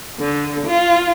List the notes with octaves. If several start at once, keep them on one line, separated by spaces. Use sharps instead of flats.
D3
F4